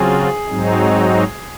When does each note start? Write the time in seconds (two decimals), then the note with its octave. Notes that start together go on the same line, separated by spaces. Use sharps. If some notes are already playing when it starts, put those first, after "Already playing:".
Already playing: C#3 F#3 C4 F4 G#4
0.48 G#2 F#3 C4 D#4